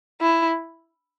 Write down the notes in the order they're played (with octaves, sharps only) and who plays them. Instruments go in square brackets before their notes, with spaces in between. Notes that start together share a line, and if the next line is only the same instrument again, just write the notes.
[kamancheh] E4